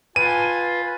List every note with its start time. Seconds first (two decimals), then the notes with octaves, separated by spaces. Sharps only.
0.16 F4 B4 G#5 D#7